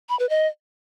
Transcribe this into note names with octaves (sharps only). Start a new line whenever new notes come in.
B5
B4
D#5